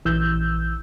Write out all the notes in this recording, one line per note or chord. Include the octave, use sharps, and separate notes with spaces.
A#1 E3 E6 G6